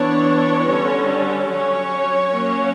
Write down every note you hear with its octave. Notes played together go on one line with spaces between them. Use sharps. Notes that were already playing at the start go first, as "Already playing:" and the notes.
Already playing: E3 B3 D4 C#5
D3 G3 C#4
F#3 C#4 C#5
F#3 A#3 C#4